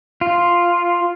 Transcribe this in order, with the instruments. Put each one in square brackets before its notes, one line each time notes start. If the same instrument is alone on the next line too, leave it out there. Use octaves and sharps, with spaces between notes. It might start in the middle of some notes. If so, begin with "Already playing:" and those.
[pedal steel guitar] F4